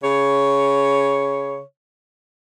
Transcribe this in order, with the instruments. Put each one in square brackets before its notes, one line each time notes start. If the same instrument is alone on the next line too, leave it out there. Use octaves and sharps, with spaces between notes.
[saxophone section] C#3 C#5